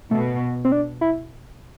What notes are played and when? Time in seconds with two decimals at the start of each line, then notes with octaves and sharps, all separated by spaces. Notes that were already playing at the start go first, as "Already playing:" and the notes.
0.11 B2 A3
0.65 C4
0.72 D4
1.01 E4